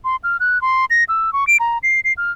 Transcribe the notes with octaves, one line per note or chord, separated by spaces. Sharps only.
C6
F6
F#6
C6
A#6
E6
C#6
D7
A#5
C7
C7
F6